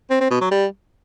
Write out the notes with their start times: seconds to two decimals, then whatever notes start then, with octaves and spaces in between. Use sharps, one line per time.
0.10 C4
0.21 C4
0.31 B2
0.41 F#3
0.51 G3